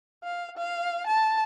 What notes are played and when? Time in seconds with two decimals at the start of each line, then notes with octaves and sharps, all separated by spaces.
0.24 F5
0.57 F5
1.07 A5